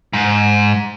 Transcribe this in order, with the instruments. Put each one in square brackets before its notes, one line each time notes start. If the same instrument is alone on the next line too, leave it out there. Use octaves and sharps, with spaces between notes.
[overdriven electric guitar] G#2